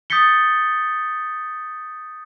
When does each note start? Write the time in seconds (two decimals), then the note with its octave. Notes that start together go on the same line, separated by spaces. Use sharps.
0.10 D#6 G6 A6 B6 C#7 G7